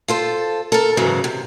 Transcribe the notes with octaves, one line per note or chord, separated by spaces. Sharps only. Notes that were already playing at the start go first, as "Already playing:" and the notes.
F4 A4 C5
A4 A#4
G#2 C#3 E3 F#3 G#3
C3